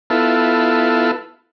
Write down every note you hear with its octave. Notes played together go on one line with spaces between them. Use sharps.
B3 E4 F4 A4